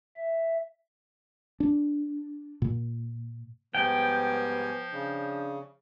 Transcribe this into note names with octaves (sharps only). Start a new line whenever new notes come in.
E5
D4
A#2
G#2 F3 G3 B3 G5 G#5
C#3 D4